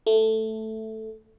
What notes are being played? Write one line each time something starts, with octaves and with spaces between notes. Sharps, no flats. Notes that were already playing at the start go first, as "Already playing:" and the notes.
A3